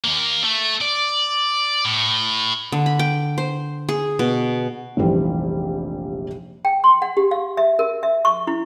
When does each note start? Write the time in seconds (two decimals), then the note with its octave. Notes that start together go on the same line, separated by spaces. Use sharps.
0.04 D#2 A#3
0.44 A3
0.81 D5
1.85 A2
2.72 D3
2.86 B5
2.99 G5
3.38 C5
3.89 G#4
4.19 B2
4.97 F1 A#1 E3 G3 C4
6.65 G5
6.84 C6
7.02 F#5
7.17 G4
7.31 F5
7.57 E5
7.79 A#4
8.03 E5
8.25 C#6
8.47 E4